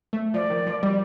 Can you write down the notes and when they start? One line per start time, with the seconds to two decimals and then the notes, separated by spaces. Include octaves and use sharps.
0.13 A3
0.34 F3 D5
0.50 D#3
0.66 F3
0.83 G3